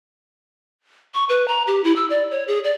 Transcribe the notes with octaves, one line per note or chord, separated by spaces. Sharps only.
C#6
B4
A#5
G4
E4
E6
D5
C#5
G#4
D5